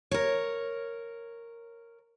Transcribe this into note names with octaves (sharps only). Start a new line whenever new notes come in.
A#4 C#5